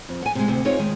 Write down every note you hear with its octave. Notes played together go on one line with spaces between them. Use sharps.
F2
F#5 G#5
C3 G#3
D2 C3
C4 D#4 F4 G#4 C#5
D#3 G#3